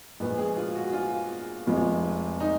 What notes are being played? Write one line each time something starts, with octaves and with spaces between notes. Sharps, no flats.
A#1 A#2 G#3 B4
G#4
F4
F#4
F4
F1 F2 F3 G#3
D#4